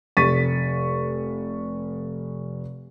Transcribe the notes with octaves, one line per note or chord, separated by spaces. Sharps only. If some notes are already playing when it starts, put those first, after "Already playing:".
F1 C#6 A6 B6 D#7